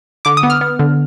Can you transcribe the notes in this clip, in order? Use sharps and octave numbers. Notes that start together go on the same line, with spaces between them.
D3 D6
D#6
B3
F6
B3
D3